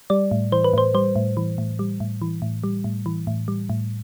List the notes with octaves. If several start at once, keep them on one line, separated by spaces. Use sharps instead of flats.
G3 D5
A2
E3 C5
B4
A2 C5
G3 C5
A2
E3
A2
G3
A2
E3
A2
G3
A2
E3
A2
G3
A2